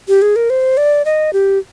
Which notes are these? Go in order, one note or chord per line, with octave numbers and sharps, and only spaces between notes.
G4
G#4
A#4
C5
D5
D#5
G4